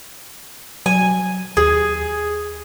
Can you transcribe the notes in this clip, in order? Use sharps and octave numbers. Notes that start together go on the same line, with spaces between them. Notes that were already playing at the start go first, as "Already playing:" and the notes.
F#3 G#5
D#2 G#4